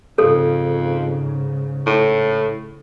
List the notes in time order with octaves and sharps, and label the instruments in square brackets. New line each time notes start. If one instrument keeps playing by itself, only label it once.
[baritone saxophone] F2 [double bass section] G#2 C#3 [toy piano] A4
[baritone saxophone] A2